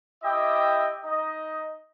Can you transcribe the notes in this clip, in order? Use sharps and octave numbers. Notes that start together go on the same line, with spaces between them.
E4 G4 D#5 E5 G5
D#4 D#5